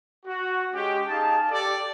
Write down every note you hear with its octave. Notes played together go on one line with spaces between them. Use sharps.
F#4
G#3 C#4 G4
D#4 G#4 F5 A5
G4 A4 D5